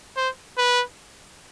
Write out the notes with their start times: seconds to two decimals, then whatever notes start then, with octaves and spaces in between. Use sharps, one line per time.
0.17 C5
0.58 B4